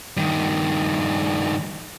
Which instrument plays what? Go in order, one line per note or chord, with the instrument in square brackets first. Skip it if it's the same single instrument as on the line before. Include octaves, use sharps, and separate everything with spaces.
[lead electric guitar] G2 D#3